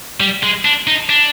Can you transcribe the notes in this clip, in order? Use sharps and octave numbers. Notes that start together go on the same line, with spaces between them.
G3
G#3
D4
D#4
D4